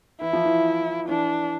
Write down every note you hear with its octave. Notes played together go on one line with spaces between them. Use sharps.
E3 E4
F3
E3
E3 D4